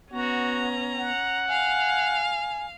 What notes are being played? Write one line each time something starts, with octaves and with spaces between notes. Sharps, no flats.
B3 C#4 F#4 A#5
F#5
F5 G#5